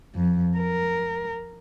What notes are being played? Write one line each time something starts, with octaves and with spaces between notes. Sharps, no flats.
F2
A#4